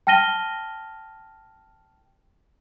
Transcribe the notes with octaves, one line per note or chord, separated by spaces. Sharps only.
G5 A5 F6 A#6 D#7 G7